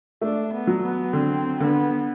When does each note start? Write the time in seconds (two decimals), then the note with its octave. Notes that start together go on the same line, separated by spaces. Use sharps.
0.21 A3 D4
0.53 B3
0.67 F#3
0.83 B3
1.13 D3 C4
1.60 D3 B3